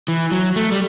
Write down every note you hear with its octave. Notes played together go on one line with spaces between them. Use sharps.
E3
F#3
A3
G3